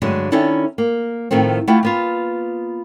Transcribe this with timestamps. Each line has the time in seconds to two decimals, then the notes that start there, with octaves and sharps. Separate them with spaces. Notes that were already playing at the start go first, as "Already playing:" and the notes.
0.02 G2 D3 F#3 G#3 A3
0.32 D#3 C#4 D4 E4 A4
0.78 A#3
1.31 A2 D#3 F3 A3 C4
1.68 A3 E4 F4 G4 F#5 G5
1.83 A#3 B3 F4